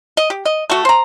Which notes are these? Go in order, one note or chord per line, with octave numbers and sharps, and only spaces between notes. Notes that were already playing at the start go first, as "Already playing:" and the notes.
D#5
G4
D#5
A3 F#4
C5 A#5